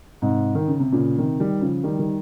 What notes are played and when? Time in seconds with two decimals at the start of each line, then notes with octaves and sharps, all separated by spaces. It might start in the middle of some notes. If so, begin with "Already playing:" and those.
0.22 G#2 C3
0.55 D#3
0.68 C#3
0.80 C3
0.93 A#2 C#3
1.18 C3 D#3
1.40 D#3 G3
1.61 C#3 F3
1.83 D#3 G3
1.99 D#3 G3